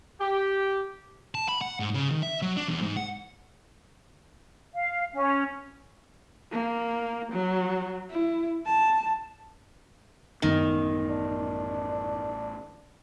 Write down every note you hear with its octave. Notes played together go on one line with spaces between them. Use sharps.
G4
A5
B5
F#5
G#2
C#3
D#3
E5
F#3
D4
E2
G#2
F#5
F5
C#4
A#3
F#3
E4
A5
A1 F#2 D#3 G#3 B3
D4